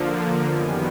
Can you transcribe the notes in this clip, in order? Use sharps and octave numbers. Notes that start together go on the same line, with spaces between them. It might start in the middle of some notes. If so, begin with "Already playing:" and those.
Already playing: D3 F3 A#3
F#2 D#3 G3 B3 G#5